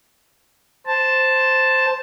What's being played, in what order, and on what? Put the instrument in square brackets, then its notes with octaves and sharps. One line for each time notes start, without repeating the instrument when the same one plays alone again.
[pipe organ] C5 A5